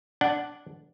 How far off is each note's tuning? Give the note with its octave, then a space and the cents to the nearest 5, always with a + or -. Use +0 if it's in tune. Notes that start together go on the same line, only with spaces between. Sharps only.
D4 -5 F#5 +0